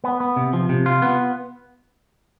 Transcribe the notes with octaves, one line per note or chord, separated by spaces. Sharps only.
B3
B3
C3
F3
C3
F4
B3